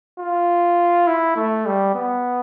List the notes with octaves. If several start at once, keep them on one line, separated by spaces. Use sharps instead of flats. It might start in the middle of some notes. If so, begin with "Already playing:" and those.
F4
E4
A3
G3
B3